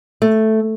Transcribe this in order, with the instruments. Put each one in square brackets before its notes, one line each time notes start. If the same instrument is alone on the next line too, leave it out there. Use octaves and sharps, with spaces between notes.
[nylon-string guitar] A3